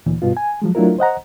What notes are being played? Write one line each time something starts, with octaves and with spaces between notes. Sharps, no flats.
D2 A#2 E3
G2 B2 B3 F4
G#5
F3 F#3 G#3
F#3 A3 D4 E4 F4 A#4
C5 D#5 F#5 A#5